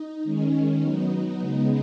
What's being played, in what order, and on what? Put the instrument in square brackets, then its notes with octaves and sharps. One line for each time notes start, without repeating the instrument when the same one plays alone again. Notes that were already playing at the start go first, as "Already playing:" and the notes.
Already playing: [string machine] D#4
D#3 G#3 C#4
F#3 B3 D#4
C#3 G#3 B3 D#4